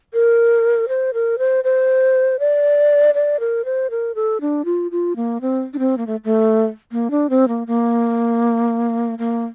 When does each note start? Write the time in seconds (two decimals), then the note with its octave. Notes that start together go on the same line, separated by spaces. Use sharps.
0.14 A#4
0.89 C5
1.14 A#4
1.39 C5
1.64 C5
2.39 D5
3.15 D5
3.40 A#4
3.65 C5
3.90 A#4
4.15 A4
4.41 D4
4.65 F4
4.91 F4
5.16 A#3
5.41 C4
5.74 D4
5.79 C4
5.98 A#3
6.07 A3
6.24 A3
6.92 A#3
7.11 D4
7.30 C4
7.48 A#3
7.67 A#3
9.19 A#3